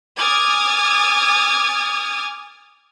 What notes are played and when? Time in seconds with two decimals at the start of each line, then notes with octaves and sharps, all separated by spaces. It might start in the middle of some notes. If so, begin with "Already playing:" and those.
0.19 G#5 D6 D#6 F6 G#6 A6